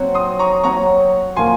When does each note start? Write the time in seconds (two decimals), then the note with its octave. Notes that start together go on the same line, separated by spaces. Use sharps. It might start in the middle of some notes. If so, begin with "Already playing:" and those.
Already playing: F#3 C4 F#4 C#5
0.14 C6 D#6
0.39 A#5 C#6
0.64 F#3 C4 F#4 C#5 A#5 C#6
1.36 F3 A#3 F4 G#5 C6